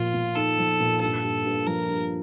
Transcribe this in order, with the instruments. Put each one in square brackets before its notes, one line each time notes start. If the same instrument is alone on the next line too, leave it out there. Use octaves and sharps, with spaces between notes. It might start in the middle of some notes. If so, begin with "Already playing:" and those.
Already playing: [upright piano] A#2 F3 [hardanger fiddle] F4
[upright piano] A#2
[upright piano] D#4 [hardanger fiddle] A4
[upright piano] F3
A#2
[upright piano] G2 [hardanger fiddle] A4
[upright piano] G2
G2
[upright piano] F3 [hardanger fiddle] A#4
[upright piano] G2